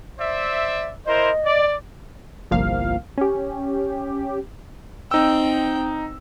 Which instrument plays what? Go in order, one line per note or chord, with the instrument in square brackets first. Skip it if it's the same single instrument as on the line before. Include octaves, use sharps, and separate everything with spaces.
[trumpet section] C5 D5 E5
[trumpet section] E4 A#4 C5 [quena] D#5
[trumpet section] D5
[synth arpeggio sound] G1 C2 F3 A#3 F5
C#4 G4
[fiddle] C4 G5 [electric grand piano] D#4 E6